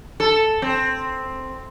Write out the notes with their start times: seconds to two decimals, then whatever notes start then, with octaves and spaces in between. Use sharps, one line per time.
0.20 A4
0.62 C4